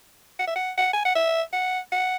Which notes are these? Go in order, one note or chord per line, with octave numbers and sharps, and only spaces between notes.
F#5
E5
F#5
F#5
G#5
F#5
E5
F#5
F#5